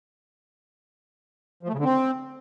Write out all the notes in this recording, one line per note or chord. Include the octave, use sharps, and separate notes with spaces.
F3
A3
C#3
D3
C4